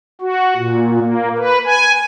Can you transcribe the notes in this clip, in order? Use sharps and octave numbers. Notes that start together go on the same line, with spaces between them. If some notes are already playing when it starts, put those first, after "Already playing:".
F#4
A#2
A#3
B4
G#5